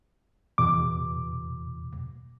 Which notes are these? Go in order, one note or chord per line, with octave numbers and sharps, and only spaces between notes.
E2 B2 D6